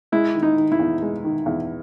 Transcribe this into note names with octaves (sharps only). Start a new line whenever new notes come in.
G#3 E4
D#3
D#4
D#3
E4
E2
G#3
D#3
E2